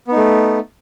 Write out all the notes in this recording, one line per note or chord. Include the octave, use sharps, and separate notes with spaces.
A3 B3 D#4